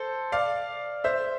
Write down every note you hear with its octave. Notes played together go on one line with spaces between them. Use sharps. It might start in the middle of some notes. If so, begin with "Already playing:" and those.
Already playing: A4 C5
D5 F5
C5 E5